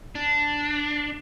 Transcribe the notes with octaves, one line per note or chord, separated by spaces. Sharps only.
D4